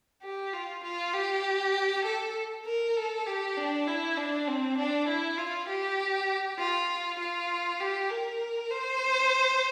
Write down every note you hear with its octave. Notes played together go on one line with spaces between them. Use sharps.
G4
F4
F4
G4
A4
A#4
A4
G4
D4
E4
D4
C4
D4
E4
F4
G4
F4
F4
G4
A#4
C5